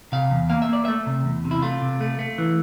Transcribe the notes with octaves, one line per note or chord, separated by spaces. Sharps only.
C3 F5
E2
A#3 F5
E5
A#3 D5
A3 E5
C3
E2
C3
E4
A3 F4
C3
A3
A3
E3